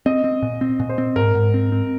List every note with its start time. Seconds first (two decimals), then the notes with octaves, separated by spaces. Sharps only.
0.06 C4 D#5
0.24 C4
0.42 A#2
0.61 C4
0.80 A#2
0.89 C5
0.98 C4
1.16 G#2 A#4
1.35 G#2
1.54 C4
1.72 C4